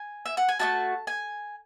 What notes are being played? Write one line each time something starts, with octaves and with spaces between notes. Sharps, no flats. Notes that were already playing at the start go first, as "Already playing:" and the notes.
Already playing: G#5
E5
F#5
G#5
A3 D#4 F#4 A5
G#5